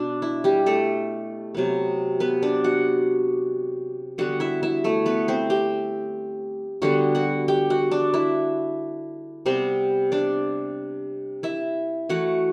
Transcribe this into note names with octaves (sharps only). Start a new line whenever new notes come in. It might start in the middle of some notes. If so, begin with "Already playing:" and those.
Already playing: B2 D4
E4
G3 G4
A3 A4
C3 F#3 B3
B3 B4
D4 D5
F#4 F#5
D3 G3 B3 F#4 F#5
E4 E5
E4 E5
A3 A4
B3 B4
C4 C5
G4 G5
D3 G3 B3 F#4 F#5
F#4 F#5
G4 G5
F#4 F#5
D4 D5
E4 E5
C3 G3 B3 C4 C5
D4 D5
E4 E5
E3 A3 F#4 F#5